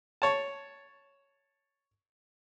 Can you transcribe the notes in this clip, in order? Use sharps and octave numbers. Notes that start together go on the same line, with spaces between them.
C#5 A5